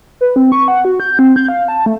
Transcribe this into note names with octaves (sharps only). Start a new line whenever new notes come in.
B4
C4
C#6
F#5
F#4
G6
C4
G6
F5
A5
A3